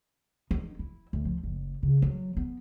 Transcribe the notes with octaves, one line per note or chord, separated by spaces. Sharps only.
D#4
E4
D2
F3
F#1
C#3
F#3
B3